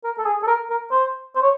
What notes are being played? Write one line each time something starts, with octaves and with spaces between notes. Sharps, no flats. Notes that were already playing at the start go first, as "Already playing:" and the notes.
A#4
A4
G#4
A4
A#4
A#4
C5
C5
C#5